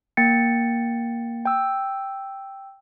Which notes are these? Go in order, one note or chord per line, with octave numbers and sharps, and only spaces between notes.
A#3 G5 A6 C#7
G5 E6